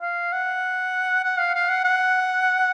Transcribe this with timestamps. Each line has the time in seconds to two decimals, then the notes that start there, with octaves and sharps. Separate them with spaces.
0.02 F5
0.32 F#5
1.24 F#5
1.39 F5
1.55 F5
1.69 F#5
1.84 F#5